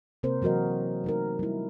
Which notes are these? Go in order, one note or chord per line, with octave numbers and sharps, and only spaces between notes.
C3 A#3 C4 A#4 C5
E3 F#3 F#4 A#4 D#5
A3 D#4 A#4
G3 E4